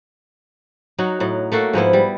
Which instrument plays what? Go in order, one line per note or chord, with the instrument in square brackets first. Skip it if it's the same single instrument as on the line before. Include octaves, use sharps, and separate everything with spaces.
[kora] F#3 D#4 F#4
A2 F#3
A3 A#3 F#4 A4
G#2 F3 B3 E4
G3